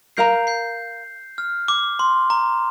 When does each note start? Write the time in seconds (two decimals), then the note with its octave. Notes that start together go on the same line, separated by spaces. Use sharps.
0.17 A#4 F5 A#5 G6 C7
0.47 G6 C7
1.38 F6
1.68 D6
1.99 C6
2.30 A#5